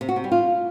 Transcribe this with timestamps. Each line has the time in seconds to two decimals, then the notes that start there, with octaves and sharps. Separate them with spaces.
0.01 C3
0.09 F#4
0.16 C3
0.24 G3
0.32 F4